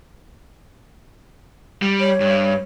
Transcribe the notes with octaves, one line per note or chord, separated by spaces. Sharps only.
G3
C#5
G2